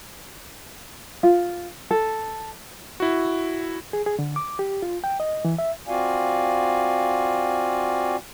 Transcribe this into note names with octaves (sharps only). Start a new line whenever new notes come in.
F4
A4
E4 F#4
G#4
G#4
D3
D6
G4
F4
G5
D#5
E3
E5
C4 F4 F#4 D5 F5 G#5